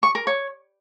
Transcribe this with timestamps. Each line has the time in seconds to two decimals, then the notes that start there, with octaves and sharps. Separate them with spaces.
0.03 C#6
0.15 A#4
0.27 C#5